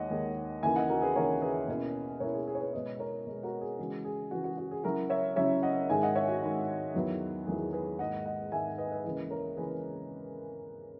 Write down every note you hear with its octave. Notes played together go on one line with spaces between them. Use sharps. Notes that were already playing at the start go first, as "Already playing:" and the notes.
Already playing: D#2 D#3 G#3 C#5 D#5 F#5
D#2 D#3 G#3
D#2 C#3 E3 A#3 E4 E5 G#5
D#5 F#5
F#4 A#4
G#4 B4
D#2 C#3 E3 A#3 E4 A#4 C#5
G#4 B4
B2 A#3 C#4 E4
B2 A#3 C#4 E4 A#4 C#5
G#4
G#4
C#5
G#4 B4
B2 G#3 B3 B4 D#5
A#4 C#5
B2 G#3 B3
F#4 A#4
G#4
C#3 E3 G#3 F#4
G#4
C#3 E3 G#3 F#4
F#4
F#4
G#4
C#3 F#3 C#4 E4 F#4 A#4
C#5 E5
C#3 F#3 C#4 E4 C#5 E5
D#5 F#5
G#2 D#3 G#3 E5 G#5
D#5 F#5
C#5 E5
F#4
G#2 D#3 G#3
E2 D#3 F#3 B3 E4
E2 D#3 F#3 B3 E4 G#4
G#4 B4
G#2 D#3 A#3 D#4 D#5 F#5
D#5 F#5
G#2 D#3 A#3 D#4 E5 G#5
B4 D#5
B4 D#5
C#2 C#3 E3 A#3 B4 D#5
A#4 C#5
C#3 E3 A#3 G#4 B4